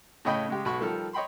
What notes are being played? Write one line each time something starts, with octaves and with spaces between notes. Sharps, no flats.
A2 C#3 C#5 D#5 G5 B5
C#3 G#3 G4
B1 F#4 B5 C#6
D#3 F3 G3 A4 A#4
C#5 D#5 G5 B5 C6